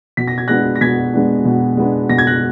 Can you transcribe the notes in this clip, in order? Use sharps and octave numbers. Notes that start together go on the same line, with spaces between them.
B2 B6
A#6
G#6
G#3 B3 D4 F#6 A#6
A#6
B2 G#6 B6
G#3 B3 D4
B2
G#3 B3 D4
B2 A#6
G#6
F#6 A#6